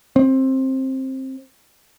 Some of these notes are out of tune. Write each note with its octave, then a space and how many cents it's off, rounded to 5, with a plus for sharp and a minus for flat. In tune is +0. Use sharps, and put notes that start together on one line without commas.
C4 +15